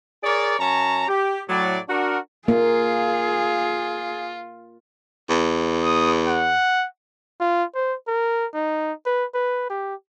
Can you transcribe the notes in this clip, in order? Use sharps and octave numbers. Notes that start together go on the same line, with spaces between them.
G#4 A#4 C#5 D5
F#2 C#4 C#5 A5 A#5
G4
A2 F#3 D5
D4 F#4 A#4
A#3 F4 G#4
E2
D#6
F#5
F4
C5
A#4
D#4
B4
B4
G4